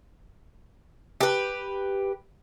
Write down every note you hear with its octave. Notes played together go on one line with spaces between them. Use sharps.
G4 B4